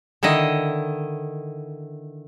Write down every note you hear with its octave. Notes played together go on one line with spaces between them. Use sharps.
D3 D#3 E4 D#5